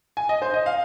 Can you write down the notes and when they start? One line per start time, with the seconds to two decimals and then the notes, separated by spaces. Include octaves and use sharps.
0.17 G#5
0.29 D#5
0.42 C5
0.54 D#5
0.66 F5